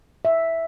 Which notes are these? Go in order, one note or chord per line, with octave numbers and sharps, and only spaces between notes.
E5